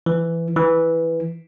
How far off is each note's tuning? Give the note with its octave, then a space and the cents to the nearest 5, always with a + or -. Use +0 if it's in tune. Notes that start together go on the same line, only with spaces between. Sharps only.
E3 +15
E3 +0